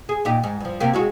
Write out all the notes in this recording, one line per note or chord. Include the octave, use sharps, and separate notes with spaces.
G#4
A#2 D#4 G4
G#2
G2 F3
C3 A#3 G4
F#3 G#3 F#4